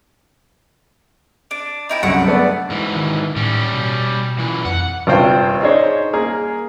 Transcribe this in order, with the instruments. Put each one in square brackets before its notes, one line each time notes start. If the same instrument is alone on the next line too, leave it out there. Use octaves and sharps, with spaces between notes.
[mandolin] D4
D#4 E4 G5
[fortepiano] C2 F#2 D3 [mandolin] F#5 B5 C#6
[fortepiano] A3 B3 D5
[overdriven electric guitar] G#2 E3
[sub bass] D#3
[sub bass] A2 [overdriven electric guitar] G3 C#4
[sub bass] B2
[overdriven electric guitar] A#2 E3
[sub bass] F2 [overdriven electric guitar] F#5
[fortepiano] G#1 G2 C3 F4 C5 G5
D4 D#4 G#4 C5 C#5
A#3 G#4 A#4